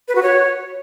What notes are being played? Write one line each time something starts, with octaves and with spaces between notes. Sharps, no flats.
B4
F#4
C#5